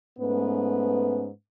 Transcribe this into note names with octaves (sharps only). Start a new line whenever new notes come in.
G#2 A3 B3 C#4 B4